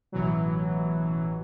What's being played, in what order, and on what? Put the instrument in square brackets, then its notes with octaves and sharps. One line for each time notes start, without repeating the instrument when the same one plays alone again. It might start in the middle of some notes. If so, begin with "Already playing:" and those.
[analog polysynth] A1 B2 E3 F#3